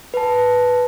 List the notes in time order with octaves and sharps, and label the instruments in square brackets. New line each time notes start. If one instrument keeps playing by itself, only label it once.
[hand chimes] B4 A5